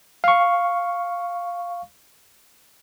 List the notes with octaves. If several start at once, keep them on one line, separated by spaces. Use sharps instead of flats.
F5 C#6